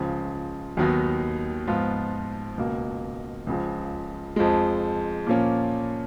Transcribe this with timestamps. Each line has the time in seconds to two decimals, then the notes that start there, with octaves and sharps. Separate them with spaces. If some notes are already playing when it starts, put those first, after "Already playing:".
Already playing: C#2 C#3 F3
0.77 D#2 D#3 F#3 B3 D#4
1.67 G#2 F3 B3 F4
2.57 C#2 B2 A#3
3.47 C#2 C#3 F3
4.36 F2 F3 G#3
5.27 A#2 F3 A#3 C#4